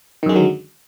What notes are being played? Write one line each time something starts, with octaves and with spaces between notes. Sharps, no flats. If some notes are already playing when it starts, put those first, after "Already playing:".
F#2 D3 D#3 F#3 G#3